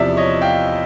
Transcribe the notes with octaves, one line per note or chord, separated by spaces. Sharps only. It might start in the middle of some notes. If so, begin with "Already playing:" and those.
Already playing: E2 C3 F3 D5 E5
C#5 D#5
F5 G5